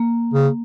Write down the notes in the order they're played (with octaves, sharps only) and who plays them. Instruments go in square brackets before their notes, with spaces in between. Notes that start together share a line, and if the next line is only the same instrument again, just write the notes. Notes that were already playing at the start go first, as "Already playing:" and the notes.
Already playing: [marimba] A#3
[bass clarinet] C#3